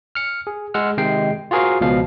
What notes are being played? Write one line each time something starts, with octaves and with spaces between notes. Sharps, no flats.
F6 C#7
G#4
G#3 F#5 E6 F6
C3 D#3 G#3 D#5 G5 C7
F4 F#4 G#4 A#4 C5 F5
C#2 B2 F3 F5